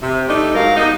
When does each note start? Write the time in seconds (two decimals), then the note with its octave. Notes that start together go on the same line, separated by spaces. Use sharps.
0.02 C3
0.29 G3 A3 D4 D#4
0.55 G#2 F#3 A#4 F5
0.76 G3 B3 D#4